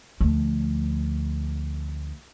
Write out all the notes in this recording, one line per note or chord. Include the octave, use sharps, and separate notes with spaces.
D2 F3